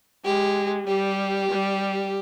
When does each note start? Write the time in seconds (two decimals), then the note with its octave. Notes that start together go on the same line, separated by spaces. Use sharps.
0.24 G#3 G4
0.87 G3 G4
1.51 G3